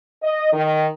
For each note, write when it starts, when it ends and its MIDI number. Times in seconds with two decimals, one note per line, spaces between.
0.22 0.52 75
0.52 0.85 51